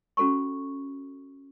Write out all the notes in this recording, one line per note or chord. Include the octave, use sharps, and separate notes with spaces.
C#4 F#4 A4 B5 C#6